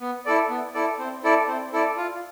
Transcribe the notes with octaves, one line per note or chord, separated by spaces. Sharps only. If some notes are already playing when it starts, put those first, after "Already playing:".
B3
E4 A4 D5
B3
E4 A4 D5
C4
E4 A4 D5
C4
E4 A4 D5
F4